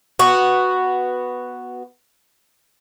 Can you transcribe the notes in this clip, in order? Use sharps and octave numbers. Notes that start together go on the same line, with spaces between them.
B3 F#4